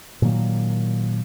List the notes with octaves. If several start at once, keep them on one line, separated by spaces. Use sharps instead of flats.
A#2 D#3 F#3 A#3